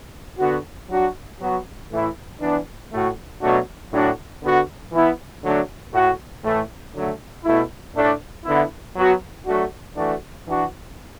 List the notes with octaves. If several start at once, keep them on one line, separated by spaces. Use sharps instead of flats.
D3 B3 F#4
F#3 D4 F#4
F#3 B3 F#4
A2 E3 A3 E4
E3 B3 D4
A2 A3 F#4
B2 F#3 A3 D4 F#4
A2 F#3 D4 F#4
D3 B3 F#4
E3 B3 E4
D3 F#3 A3 D4
A2 A3 F#4
A2 E3 A3 E4
D3 F#3 A3
B2 A3 E4
A2 A3 D4
D3 B3 E4
F#3 B3 F#4
F#3 A3 D4 F#4
E3 A3 D4 F#4
E3 D4 F#4